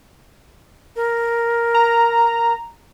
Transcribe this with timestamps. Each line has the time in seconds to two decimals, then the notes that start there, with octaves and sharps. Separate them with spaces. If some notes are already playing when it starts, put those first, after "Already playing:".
0.96 A#4
1.74 A#5